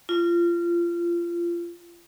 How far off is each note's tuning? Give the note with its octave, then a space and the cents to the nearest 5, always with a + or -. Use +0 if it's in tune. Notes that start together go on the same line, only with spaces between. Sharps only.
F4 -25